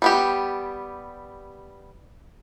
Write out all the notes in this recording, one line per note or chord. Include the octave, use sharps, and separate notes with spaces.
G3 B3 G4